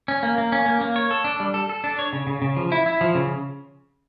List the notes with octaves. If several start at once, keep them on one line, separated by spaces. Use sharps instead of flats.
C#4
A#3
A#3
C#4
A#3
A#3
C#5
A4
D4
G3
A4
A4
D4
C#5
C#3
C#3
C#3
F3
E4
E4
F3
C#3